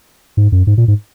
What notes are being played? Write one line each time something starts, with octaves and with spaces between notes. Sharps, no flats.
G#2
F#2
G#2
A#2
G#2